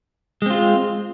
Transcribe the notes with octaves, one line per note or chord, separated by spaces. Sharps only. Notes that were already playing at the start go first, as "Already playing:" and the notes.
G#3 C4 F4